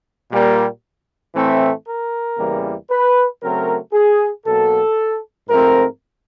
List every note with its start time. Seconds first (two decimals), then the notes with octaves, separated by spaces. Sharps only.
0.31 A#2 G3 A#3
1.35 A2 E3 A3 C4
1.87 A#4
2.38 E2 C#3 E3 G3 A#3
2.90 B4
3.42 C#3 F#3 A3 C4 A#4
3.93 G#4
4.46 B2 F#3 A#3 A4
5.49 G#2 F3 A3 C4 A#4